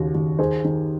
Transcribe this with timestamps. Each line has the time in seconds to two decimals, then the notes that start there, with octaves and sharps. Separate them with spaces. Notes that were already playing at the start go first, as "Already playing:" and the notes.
Already playing: D#2 C#3 F#4
0.15 D#2
0.39 D#3 G#4 C5
0.64 D#3